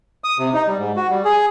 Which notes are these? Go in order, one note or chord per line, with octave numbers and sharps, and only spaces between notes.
D#6
C3
D#4
G3
G#2
F#4
G3
G#4